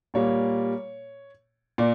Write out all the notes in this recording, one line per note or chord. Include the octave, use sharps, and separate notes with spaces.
A#2 G3 A#3 C#5
A#2 D5